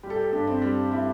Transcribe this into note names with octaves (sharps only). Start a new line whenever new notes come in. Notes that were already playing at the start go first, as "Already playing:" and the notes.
G3 G4
A4
G4
A4
G2 G4
C4
G3
G3 E4